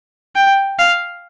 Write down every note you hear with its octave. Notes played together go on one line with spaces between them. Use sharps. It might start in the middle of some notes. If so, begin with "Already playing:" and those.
G5
F5